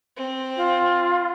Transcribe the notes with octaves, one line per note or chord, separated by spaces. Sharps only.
C4
F4